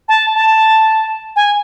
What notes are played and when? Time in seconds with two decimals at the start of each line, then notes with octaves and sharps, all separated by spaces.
0.09 A5
0.34 A5
1.36 G#5